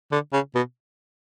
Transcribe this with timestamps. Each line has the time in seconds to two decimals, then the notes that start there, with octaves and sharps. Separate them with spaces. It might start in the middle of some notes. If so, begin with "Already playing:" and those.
0.12 D3
0.33 C#3
0.55 B2